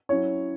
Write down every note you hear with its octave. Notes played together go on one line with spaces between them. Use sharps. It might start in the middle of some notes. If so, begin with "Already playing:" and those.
F#3 C#4 E4 C#5